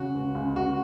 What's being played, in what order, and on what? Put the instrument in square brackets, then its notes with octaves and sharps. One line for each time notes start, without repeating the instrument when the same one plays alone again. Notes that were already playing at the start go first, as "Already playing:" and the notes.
Already playing: [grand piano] C#3 [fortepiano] F#4
[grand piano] C#2
C#2
[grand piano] C#2 [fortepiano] F#4